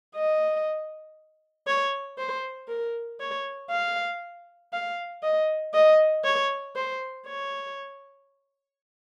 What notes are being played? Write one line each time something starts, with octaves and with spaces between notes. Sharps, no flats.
D#5
C#5
C5
A#4
C#5
F5
F5
D#5
D#5
C#5
C5
C#5